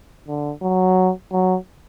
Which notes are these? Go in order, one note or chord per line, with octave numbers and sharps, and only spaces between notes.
D3
F#3
F#3